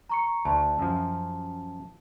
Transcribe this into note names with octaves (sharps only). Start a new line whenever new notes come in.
A#5 C#6 C#7
D2 A5
F#2 F3